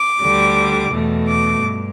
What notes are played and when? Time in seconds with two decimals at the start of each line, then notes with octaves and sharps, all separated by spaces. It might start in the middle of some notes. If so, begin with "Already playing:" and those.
Already playing: D6
0.24 D2 D3 G3
0.93 E2 B2 A3
1.27 D6
1.62 G2